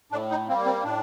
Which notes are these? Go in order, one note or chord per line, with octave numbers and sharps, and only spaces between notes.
A2 D4
D#4
G3 A#3 C4
C4
A2 D4